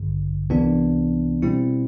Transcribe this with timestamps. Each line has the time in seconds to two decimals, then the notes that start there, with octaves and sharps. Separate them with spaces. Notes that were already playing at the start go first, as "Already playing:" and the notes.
Already playing: A1 G2 D3
0.50 C2 C3 E3 B3 D4
1.42 B2 G3 C4 E4